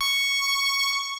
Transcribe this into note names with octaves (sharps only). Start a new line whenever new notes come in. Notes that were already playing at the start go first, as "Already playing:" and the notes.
C#6